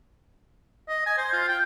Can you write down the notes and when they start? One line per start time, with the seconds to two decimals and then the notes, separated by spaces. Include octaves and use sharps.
0.88 D#5
1.06 G#5
1.18 C5
1.33 F4
1.48 G5